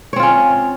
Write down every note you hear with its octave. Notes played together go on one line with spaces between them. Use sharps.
C4 C#4 F4 C#5